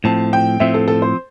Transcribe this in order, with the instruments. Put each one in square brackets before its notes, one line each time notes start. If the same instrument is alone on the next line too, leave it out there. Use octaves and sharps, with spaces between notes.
[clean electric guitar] A2 F3 C4 [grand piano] A5
[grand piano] G5
[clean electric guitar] A2 F3 C4 [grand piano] E5
[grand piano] A4
A4
C5